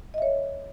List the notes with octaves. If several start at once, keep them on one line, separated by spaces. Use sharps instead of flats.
C#5 D#5 E5